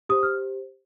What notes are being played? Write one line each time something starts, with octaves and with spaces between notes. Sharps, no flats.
G4 C5 D#6
F6